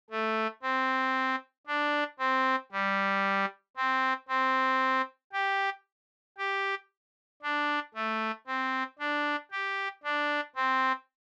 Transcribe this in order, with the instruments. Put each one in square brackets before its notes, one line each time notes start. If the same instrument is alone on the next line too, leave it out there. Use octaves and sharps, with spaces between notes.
[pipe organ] A3
C4
D4
C4
G3
C4
C4
G4
G4
D4
A3
C4
D4
G4
D4
C4